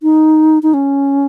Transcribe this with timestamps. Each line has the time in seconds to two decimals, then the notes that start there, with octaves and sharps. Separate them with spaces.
0.03 D#4
0.63 D#4
0.74 C#4